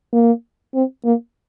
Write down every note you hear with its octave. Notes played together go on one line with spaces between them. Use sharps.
A#3
C4
A#3